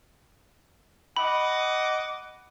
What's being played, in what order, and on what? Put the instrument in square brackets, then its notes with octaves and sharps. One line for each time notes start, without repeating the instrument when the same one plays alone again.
[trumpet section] D#5 F#5 D6 [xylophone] B5